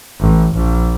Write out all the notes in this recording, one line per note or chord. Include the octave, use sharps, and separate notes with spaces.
A1
A#1